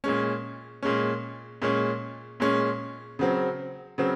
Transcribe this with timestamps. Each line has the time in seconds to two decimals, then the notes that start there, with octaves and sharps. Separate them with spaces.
0.04 A#2 G#3 C#4
0.83 A#2 G#3 C#4
1.62 A#2 G#3 C#4
2.40 A#2 G#3 C#4
3.19 C#3 F#3 C4
3.98 C#3 F#3 C4